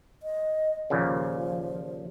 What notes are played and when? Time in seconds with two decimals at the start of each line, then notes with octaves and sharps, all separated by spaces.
0.23 D#5
0.90 D#2 A#2 C#3 F3